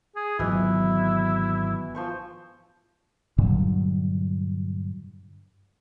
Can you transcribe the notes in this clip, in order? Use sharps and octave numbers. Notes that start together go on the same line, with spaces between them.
G#4
G#1 B2 D3 E3 F#3 E4
F3 C5 C#6
G2 A#2 D3 F#3